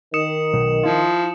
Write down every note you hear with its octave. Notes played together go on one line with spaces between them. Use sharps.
D#3 D#6 C#7 E7
B1
F3 E4 F4